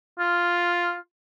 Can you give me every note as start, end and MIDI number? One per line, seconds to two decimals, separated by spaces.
0.19 0.95 65